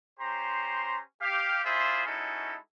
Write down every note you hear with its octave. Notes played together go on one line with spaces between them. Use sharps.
C#4 G4 C5 A#5 C6
G4 F5
E4 F4 G#4 C5 D5 E5
G#3 C#4 D#4 E4 F#4 A4